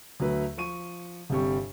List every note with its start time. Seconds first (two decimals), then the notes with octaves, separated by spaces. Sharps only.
0.20 D2 F#3 A3 B4
0.57 F3 C#6 D#7
1.30 G1 C3 G3 C#6